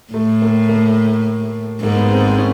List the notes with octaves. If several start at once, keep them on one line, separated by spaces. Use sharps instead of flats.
A2 A3
A#3
A#3
G#2 A#3
B3
C4
C#4